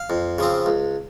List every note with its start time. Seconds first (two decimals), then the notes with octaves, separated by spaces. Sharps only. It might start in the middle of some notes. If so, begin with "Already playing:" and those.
Already playing: F5
0.10 F2
0.38 C#3 F3 C4
0.66 C#2